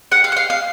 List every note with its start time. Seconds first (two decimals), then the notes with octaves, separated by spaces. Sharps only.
0.12 F#5
0.24 F5
0.32 F#5
0.37 F5
0.50 F5